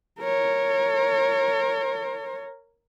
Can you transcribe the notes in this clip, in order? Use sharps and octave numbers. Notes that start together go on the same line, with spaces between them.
A#4 C#5